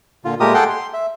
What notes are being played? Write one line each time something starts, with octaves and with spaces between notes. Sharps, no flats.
A#2 D3 F4
A#2 G#3 A3 G4 A#4 D#6
G#4 A4 F#5 G5 C6
C6
E5